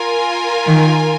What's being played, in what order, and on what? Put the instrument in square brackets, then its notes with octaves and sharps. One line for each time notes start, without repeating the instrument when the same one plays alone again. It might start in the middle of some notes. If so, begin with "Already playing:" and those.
Already playing: [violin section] F4 A#4 G#5
[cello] D#3